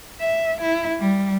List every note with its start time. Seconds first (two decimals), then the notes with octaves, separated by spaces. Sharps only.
0.21 E5
0.61 E4
1.00 G3